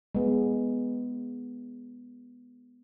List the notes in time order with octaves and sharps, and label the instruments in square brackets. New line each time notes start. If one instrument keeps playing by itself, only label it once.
[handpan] G#3 B3